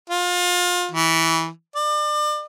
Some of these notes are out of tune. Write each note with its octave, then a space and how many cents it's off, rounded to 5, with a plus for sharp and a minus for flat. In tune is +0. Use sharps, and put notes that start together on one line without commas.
F4 +30
E3 -15
D5 +35